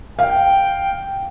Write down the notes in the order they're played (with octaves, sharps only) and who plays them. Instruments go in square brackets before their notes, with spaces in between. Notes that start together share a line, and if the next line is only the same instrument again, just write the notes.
[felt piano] F5 [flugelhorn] G5